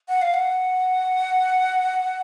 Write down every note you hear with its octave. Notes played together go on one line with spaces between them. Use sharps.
F#5
F5
F#5